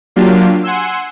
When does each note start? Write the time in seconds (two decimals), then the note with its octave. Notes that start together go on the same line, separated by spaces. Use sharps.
0.16 F#3 A#3 D4 F4 G4
0.63 F#5 G#5 C6 E6